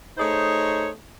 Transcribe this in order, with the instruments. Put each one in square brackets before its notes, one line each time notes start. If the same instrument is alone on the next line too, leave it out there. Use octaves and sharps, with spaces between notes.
[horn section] A3 D#4 G#4 C5 C#5